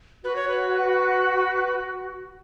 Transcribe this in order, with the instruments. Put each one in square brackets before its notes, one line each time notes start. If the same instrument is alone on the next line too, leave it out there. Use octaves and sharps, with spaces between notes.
[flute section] F#4 [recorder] B4
[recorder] C#5
B4